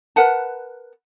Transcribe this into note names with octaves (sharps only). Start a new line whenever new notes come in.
A#4 B4 F#5 A5